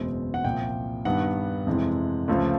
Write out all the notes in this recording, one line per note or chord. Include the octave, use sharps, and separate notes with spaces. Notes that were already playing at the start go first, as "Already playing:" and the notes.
Already playing: F#1 E2 B2 G#3 C4
F#5
C2 A#2 F3 G5
G2 D#3 G3 B3 F#5
F2 C3 E3 G#3
C#2 C#3 F3 A3 C4